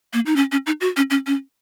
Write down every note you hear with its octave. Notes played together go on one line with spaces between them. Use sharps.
A#3
D#4
C#4
C#4
D#4
F#4
C#4
C#4
C#4